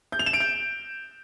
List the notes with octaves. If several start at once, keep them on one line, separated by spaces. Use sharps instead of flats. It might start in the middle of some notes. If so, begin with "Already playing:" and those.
G6
F7
E7
D7
G6